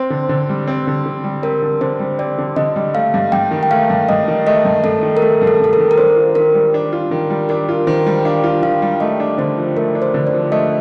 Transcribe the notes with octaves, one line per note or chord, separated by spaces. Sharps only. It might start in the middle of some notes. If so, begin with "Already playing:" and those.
Already playing: C4 C5
D3
D3
G3
C4
D3
D3
G3
C4 A#4
D3
D3 C5
G3
C4 D5
D3
D3 D#5
G3
A3 F5
G2
G2 G5
D#3
G5
A3 F5
G2
G2 D#5
D#3
A3 D#5
G2
G2 A4
D#3
A#4
A3 A4
G2
A4
G2 A4
A#4
D#3
A#4
D4 C5
F4
D#3 A#4
G3
D4
F4
D#3
G3
D4 A#4
F4
D#3 C5
G3
D4 F5
F4
D#3 F5
G3
A3 D#5
D4
D3 C5
F3
A3 A#4
D4
C5
D3
D5
F3
A3 D#5